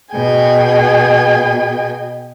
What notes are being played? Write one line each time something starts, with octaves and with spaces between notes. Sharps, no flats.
B2 G#4 G5 G#5